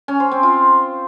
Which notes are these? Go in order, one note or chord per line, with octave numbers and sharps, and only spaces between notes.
C#4
C5
C4
F4